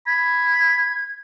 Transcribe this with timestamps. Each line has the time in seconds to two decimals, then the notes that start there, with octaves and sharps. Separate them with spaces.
0.07 B5 G#6